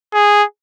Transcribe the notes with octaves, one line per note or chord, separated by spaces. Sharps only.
G#4